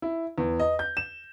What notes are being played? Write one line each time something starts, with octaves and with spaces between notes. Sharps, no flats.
E4
E2
D#5
G6
E7